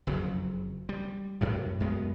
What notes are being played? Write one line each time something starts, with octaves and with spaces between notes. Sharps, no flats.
F#1 F2 C#3 F#3
G3
F#2 A2 C3
F#2 G#3 B3